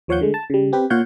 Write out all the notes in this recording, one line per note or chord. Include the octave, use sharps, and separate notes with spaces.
D#2 F3 C#5 F5 F#5 G6
D3 G#3 A3
A5
C#3 G3
C4 G4 B4
A#2 F4 C#5 F5 F#5 G6